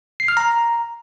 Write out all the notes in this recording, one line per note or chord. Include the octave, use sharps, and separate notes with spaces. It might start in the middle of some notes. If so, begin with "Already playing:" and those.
C7
F6
A#5